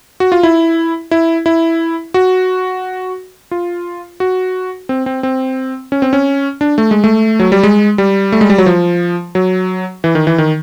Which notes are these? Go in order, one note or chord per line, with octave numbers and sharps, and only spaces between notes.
F#4
F4
E4
E4
E4
F#4
F4
F#4
C4
C4
C4
C#4
C4
C#4
D4
A3
G#3
A3
F#3
G3
G#3
G3
A3
G#3
G3
F#3
F3
F#3
E3
D#3
E3
D#3